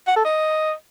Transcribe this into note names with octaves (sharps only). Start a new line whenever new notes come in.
F#5
A4
D#5